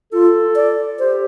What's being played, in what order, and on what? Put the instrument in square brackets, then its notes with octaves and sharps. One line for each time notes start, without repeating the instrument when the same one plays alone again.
[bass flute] F4 [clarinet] A4
[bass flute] D5
[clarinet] G4 [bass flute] C5